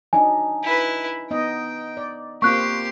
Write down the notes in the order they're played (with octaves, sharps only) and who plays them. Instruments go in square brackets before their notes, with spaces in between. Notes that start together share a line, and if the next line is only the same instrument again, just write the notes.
[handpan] F#3 D4 D#4 [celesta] G#5
[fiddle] E4 B4
[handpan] B3 D#4 D#5 [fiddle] G5
[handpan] D5
[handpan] A#3 C4 F4 [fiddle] G4 C6 [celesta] C#6 F#6